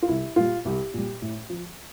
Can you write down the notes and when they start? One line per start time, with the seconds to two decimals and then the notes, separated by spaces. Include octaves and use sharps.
0.02 F4
0.08 C2 E4
0.36 A#2 G3 F4
0.65 C2 G4
0.94 A#2 G3
1.22 A2
1.50 F3